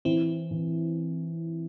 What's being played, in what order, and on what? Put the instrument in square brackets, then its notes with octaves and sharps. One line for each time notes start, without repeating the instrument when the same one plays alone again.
[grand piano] E3 [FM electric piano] C4 E4
[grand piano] E3